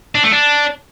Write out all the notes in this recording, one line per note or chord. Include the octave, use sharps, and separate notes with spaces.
D4
A3
D4